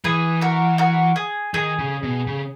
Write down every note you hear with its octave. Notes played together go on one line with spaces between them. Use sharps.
E3 G#4 B4
F#4 A#4
F#4 A#4
G#4
D#3 G#4
C#3
B2
C#3